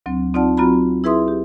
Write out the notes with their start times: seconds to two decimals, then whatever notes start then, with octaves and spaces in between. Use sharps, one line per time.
0.06 D2 F#3 C4
0.34 C4 D#4 F4 D5 F#5 A5
0.57 F#3 C4 F4 F#4 A#5 B5
1.04 E4 G#4 B4 E5 C6 D#6
1.28 G4